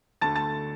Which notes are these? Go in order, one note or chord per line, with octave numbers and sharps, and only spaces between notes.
D2 D3 A3 A5 A6
A5 A6